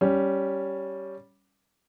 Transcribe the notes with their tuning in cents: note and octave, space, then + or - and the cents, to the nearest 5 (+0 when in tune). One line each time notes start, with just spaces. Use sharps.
G3 -5 C#4 +5